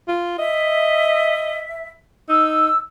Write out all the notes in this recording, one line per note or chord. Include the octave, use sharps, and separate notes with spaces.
F4
D#5 E5
D#4 E6